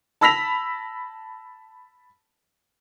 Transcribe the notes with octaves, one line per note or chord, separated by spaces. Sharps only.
A5 B5 E6 A#6 B6 F7